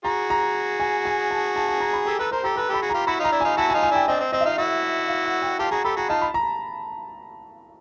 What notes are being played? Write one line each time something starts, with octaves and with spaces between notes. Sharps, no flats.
F#4 G#4 A#5
A#5
G#5
G#5
A5
A5
A5
A#5
B5
G4 A4 A#5
A4 B4 A#5
A#4 C5 A#5
G4 A4 A#5
A4 B4 A#5
G4 A4 B5
F#4 G#4
F4 G4 A#5
E4 F#4 B5
D#4 F4 A#5
D4 E4
D#4 F4 G#5
E4 F#4 A5
G#5
D#4 F4
G#5
D4 E4 G5
C4 D4 D#5
C4
C4 D#5
E5
D#4 F4 D#5
E4 F#4 E5
F5
F#5
G5
F4 G4 A5
F#4 G#4 A#5
G4 A4 B5
F#4 G#4 A#5
D#4 F4 A5
B5
A#5